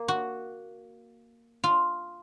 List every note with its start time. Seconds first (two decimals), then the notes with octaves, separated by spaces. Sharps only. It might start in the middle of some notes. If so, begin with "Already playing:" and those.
Already playing: A#3
0.08 F#4
1.64 F4